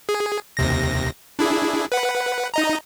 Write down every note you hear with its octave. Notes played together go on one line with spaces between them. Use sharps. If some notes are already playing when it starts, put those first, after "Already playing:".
G#4
D#2 C3 A#6
D4 E4 G#4
B4 F#5
D#4 D#5 A#5